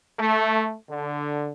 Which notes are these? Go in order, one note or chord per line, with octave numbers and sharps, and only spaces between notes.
A3
D3